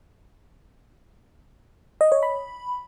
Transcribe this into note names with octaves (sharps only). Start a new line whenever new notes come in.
D#5
C#5
B5